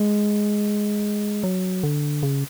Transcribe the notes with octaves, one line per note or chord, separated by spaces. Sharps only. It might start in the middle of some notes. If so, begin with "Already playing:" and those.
Already playing: G#3
F#3
D3
C#3